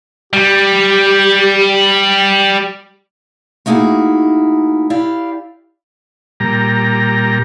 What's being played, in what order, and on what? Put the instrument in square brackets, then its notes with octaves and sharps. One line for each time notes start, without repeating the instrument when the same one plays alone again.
[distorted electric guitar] G3 [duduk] G4
[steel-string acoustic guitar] A3 A#3 D#4 E4 F#4 G#4
E4 G4 D5 F5
[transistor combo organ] A#2 G3 A#5